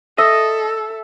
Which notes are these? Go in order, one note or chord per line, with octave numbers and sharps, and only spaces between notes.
A4 D#5 E5